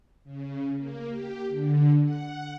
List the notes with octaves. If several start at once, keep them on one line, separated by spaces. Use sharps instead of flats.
C#3
A#3
G4
D3
F#5